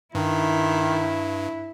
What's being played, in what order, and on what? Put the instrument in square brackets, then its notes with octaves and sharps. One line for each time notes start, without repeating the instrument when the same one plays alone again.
[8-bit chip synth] G2 [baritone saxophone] D#3 [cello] E4